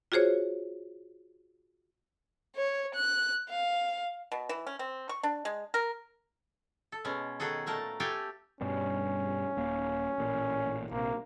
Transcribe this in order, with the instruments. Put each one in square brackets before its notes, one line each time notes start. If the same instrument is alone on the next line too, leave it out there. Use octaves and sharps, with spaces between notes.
[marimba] F4 F#4 G#4 C5 C#5
[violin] C#5
F#6
F5
[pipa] B2
E3
C#4
C4
C#6
D4
G#3
A#4
[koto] A4
B2 G#3 C#4
D#3 F#4 G#4 A4
A#2 A3 A#4 A5
A3 G4 A4 F5 G5 G#5
[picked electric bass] G2 B2 G3 [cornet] C#4
[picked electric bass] D#1 A#3
A1 A#2
[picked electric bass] A#1 C3 [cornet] A#3